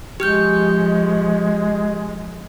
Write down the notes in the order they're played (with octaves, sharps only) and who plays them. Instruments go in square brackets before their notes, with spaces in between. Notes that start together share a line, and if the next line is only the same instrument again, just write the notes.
[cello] F3 [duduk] G#3 [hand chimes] G4 F6 G6